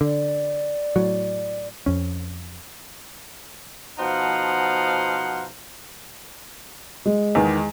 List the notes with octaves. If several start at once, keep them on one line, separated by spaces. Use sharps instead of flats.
D3 D5
A2 F#3
F2 C#4
B2 F3 D#4 C5 F5 F#5
G#3
E2 D#3